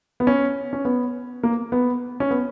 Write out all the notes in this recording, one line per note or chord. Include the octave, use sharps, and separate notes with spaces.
B3
C#4
C#4
B3
A#3
B3
C#4
B3